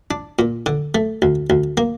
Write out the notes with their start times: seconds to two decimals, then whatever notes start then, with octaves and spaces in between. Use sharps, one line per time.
0.11 D4
0.39 A#2
0.66 D3
0.95 A3
1.22 D2
1.50 D2
1.77 A#3